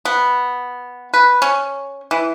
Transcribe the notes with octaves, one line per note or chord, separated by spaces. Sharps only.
B3
B4
C#4
E3